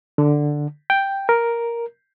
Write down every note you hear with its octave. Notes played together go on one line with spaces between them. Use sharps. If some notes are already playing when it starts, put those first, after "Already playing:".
D3
G5
A#4